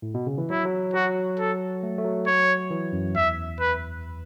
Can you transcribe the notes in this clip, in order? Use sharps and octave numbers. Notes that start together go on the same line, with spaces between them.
A2
B2
C#3
E3
F#3 E4
F#3
F#3 F#4
A4
A3
A3
F#3
C#5
E3
F#2
E2 E5
B4